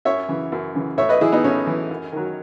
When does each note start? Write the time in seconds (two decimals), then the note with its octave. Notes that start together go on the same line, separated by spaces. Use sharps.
0.05 F#2 C#5 E5
0.28 C#3 E3
0.52 F#2
0.75 C#3 E3
0.98 A2 C#5 E5
1.09 B4 D#5
1.21 E3 E4 G#4
1.32 B3 D#4
1.44 A2 C#4
1.67 E3
1.90 F#2
2.13 D#3 F#3